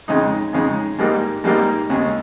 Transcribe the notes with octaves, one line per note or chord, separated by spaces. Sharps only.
F2 C#3 G#3 D#4
F2 C#3 G#3 D#4
G#2 G3 A#3 D#4
G#2 G3 A#3 D#4
D#2 C#3 G#3